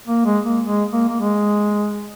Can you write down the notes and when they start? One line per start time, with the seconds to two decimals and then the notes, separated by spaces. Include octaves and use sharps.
0.08 A#3
0.26 G#3
0.45 A#3
0.64 G#3
0.92 A#3
1.09 A#3
1.20 G#3